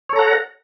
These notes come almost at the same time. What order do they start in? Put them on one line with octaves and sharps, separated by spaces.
C#5 A4 A#5 F#5